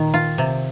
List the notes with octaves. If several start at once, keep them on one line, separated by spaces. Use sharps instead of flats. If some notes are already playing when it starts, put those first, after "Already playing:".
Already playing: A#2 D#3
F4
C3